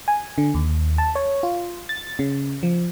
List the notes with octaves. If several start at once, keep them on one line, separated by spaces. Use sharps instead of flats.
G#5
D3
D#2
A5
C#5
F4
A6
C#3
F3